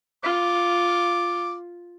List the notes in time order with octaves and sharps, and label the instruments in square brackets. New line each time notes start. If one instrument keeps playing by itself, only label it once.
[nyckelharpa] F4 [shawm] D6